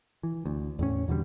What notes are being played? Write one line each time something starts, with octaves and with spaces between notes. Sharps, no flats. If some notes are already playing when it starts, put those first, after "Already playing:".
E3
D2
E2 A2 C#4
E2 B2 D3 G3